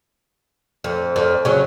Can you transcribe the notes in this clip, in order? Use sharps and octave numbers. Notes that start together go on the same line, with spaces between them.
F2
F2
C#3 F#3